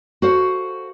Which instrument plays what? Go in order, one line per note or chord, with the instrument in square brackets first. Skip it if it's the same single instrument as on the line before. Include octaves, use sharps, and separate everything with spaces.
[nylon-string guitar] F#4 A4 C5 F5